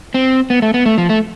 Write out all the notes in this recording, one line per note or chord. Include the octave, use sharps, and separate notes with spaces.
C4
B3
A3
B3
A3
F3
A3